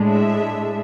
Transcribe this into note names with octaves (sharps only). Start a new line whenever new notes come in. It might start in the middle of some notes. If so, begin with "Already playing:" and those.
Already playing: A2 G#3 D4
E5